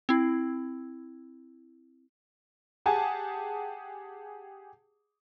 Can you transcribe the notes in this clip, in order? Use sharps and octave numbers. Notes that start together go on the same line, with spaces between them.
C4 E4
G4 G#4 F#5 G#5 A5